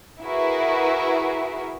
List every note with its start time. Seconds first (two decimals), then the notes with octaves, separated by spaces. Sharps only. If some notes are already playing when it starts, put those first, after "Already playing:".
0.23 E4 F#4 G#4 A#4 B4 E5